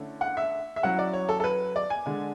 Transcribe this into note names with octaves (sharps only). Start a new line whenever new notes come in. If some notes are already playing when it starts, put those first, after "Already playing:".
Already playing: D3 A3 C#4 E4
F#5
E5
E5
F#3 C#4 E4 F#5
D5
C#5
A4
A4
B4
D5
G#5
D3 G#3 D4